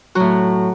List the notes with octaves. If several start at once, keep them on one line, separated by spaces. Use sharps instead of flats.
A2 F#3 F#4